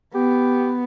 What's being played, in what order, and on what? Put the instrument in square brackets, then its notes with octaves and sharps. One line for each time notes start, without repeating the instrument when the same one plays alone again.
[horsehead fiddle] B3 [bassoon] G4